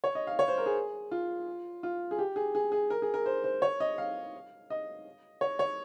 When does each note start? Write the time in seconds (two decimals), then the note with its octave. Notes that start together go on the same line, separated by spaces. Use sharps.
0.04 C#5
0.15 D#5
0.27 F5
0.39 C#5
0.48 C5
0.58 A#4
0.66 G#4
1.11 F4
1.83 F4
2.11 G#4
2.19 G4
2.36 G#4
2.55 G#4
2.72 G#4
2.90 A#4
3.02 G#4
3.14 A#4
3.26 C5
3.44 C5
3.62 C#5
3.80 D#5
3.98 F5
4.70 D#5
5.41 C#5
5.59 C#5